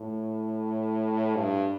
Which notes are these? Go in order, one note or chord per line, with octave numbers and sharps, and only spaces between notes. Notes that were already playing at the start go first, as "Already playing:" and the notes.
Already playing: A2
G2